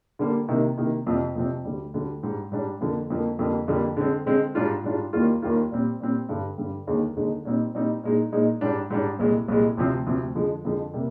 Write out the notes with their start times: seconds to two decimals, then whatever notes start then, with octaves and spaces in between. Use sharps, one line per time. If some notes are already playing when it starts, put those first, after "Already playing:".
0.19 D3 G3 A#3
0.48 C3 D#3 A#3 D#4
0.78 C3 D#3 A#3 D#4
1.06 F2 C3 F3 C4
1.36 F2 C3 F3 C4
1.65 D2 D3 G3
1.94 D2 D3 G3
2.23 G#2 G3 D4
2.52 G#2 G3 D4
2.81 F2 D3 F3 A#3
3.10 F2 D3 F3 A#3
3.39 F2 D3 G3 A#3
3.68 F2 D3 G3 A#3
3.97 D3 G#3 C4
4.26 D3 G#3 C4
4.55 G#2 G3 D4 F4
4.84 G#2 G3 D4 F4
5.13 D#2 D#3 G3 A#3 F4
5.42 D#2 D#3 G3 A#3 F4
5.71 A#2 G3 C4
6.00 A#2 G3 C4
6.29 G2 D3 G3
6.58 G2 D3 G3
6.87 D#2 D3 G#3 D#4
7.16 D#2 D3 G#3 D#4
7.45 A#2 G3 C4 D#4
7.74 A#2 G3 C4 D#4
8.03 A#2 G#3 D#4
8.32 A#2 G#3 D#4
8.61 G#2 G3 D4
8.90 G#2 G3 D4
9.19 C2 A#2 G#3
9.48 C2 A#2 G#3
9.77 D2 C3 F3 C4
10.06 D2 C3 F3 C4
10.35 F2 D3 F3 G#3
10.65 F2 D3 F3 G#3
10.94 C3 G3 A#3